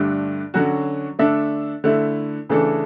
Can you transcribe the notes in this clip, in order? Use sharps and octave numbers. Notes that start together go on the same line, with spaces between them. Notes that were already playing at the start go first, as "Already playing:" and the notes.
Already playing: G2 D3 A3 D4
D3 F#3 C#4 F#4
D3 A3 D4 A4 E5
D3 A3 E4
C#3 E3 A3 D4 A4